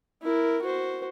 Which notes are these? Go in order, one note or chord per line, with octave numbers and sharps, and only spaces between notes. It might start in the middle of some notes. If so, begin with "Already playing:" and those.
E4 A#4
F#4 C5